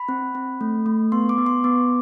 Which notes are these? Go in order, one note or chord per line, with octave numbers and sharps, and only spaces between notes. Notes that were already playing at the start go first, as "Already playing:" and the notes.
Already playing: B5
C4
C4
A3
A3
B3 C6
D6
B3
C6
B3 D6